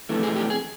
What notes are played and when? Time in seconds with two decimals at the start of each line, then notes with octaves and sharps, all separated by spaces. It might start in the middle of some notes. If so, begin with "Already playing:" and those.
0.09 F2 C3 E3 A3
0.23 G#4
0.36 G4
0.50 G#4